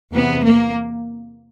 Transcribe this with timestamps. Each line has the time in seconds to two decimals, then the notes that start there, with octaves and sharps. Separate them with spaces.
0.12 E2 C3 E3 B3
0.44 A#3